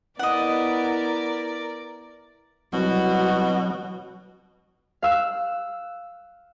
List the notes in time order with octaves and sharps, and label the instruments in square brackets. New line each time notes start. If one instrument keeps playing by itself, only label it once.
[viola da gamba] B3 E4 [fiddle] A#4 D5 [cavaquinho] D#5 F#5
[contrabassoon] C2 [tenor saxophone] B2 [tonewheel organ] F#3 [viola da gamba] F#4
[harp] F5 E6 F#6